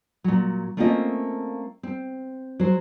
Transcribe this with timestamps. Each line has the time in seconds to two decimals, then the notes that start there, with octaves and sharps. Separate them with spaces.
0.24 A#2 F#3
0.77 A3 A#3 C4 C#4 F4 D#5
1.83 C4
2.60 F#3 C5